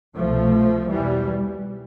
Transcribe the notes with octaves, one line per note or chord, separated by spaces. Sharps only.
C2 B2 F3 A3
E2 B2 E3 G3